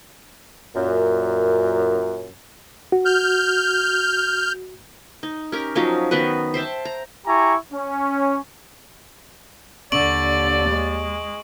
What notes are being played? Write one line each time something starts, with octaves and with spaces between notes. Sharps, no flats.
F#2 A#2
F#4
F6 G6
D#4
C#4 G4 A#4
F3 F#3 C#4 D#4
D#3 B3 F#4 B4
C5 E5 G5 A5
A#5
E4 G4 G#5 A#5 C#6
C#4
D#2 D3 D5 C#6 D7 F#7
G#3